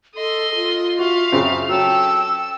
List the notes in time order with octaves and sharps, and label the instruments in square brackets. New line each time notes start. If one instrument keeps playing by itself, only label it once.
[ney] A4 [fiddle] D#5 C6
[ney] F4
[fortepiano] F#4 [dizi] E5 [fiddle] F5
[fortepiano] F#2 C#3 C4
[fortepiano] F#3 C#4 [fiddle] A4 [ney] G5 [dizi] E6